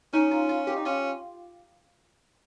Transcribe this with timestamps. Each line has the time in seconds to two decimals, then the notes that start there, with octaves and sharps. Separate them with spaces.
0.13 C#4 D#4
0.31 F4
0.49 F4
0.67 G4
0.76 D#4
0.85 C#4 F4